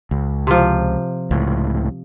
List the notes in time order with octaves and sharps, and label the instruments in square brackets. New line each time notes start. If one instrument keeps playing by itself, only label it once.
[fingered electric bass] C#2
[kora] C3 F3
[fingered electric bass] C#2 A2